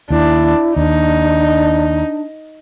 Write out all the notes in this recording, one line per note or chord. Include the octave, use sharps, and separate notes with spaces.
D#2 D4 E4
D#2 D4 D#4